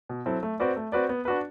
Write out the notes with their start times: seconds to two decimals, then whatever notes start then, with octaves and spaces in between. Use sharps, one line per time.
0.09 B2
0.26 F#3 C4 E4 A4
0.43 A3
0.60 C4 F#4 B4 D5
0.76 A3
0.92 C4 F#4 B4 D5
1.09 B3
1.25 D4 F#4 B4